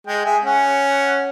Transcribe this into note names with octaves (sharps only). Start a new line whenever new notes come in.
G#3 G5
G#4 E5
C#4 F#5